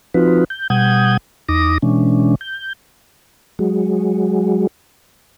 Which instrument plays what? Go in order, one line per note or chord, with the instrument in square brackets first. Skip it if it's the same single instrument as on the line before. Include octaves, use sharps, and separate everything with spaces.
[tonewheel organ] F3 C4 D#4 F4 F#4 B4
G6
B2 G3 F#5 D#6 G6 G#6
E2 D#4 D6 D#6 A#6
B2 E3 G#3 C#4 D4
G6
F#3 G#3